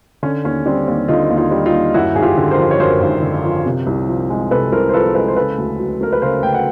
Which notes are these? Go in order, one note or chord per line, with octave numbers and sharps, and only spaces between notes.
D3 C#4
D#2 C#4
G3 C4 D4
D#2
D3 D#4 F4
D#2
D#4 F4
G3
D#4 F4
D#2
F#2 E4 F#4
G#1 G#4
F4 G4
D3
A#4 C5
F3
C#5
F#2 A#4 C5
G#1
D3
F3
C3
C2
F3
G#3
C3 A4 B4
C2 A#4 C5
C5
F3 A4 B4
G#3 A4 B4
C5
C#3 A4 B4
D2
F#3
A3 A#4
B4
C#3 A#4 C5
D2 G5
F#5